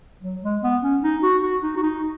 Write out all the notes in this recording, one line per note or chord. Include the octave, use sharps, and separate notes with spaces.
F#3
G#3
B3
C#4
D#4
F#4
F#4
D#4
F#4
D#4